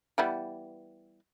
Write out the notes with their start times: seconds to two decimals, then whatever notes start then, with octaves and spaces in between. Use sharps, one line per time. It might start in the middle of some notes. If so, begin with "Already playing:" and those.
0.18 E3 G3 B3